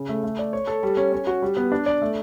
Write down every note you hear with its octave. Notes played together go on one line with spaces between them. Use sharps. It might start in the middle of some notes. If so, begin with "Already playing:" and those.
Already playing: C#3
A3
A3
D5
C#5
A4
G3
C#4
C#4
F#4
G3
B3
D4
D5
A3